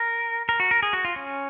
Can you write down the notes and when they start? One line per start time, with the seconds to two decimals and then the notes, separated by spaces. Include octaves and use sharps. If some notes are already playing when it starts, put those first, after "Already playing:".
Already playing: A#4
0.49 A#4
0.60 F#4
0.71 A#4
0.83 G#4
0.93 F#4
1.05 F4
1.16 C#4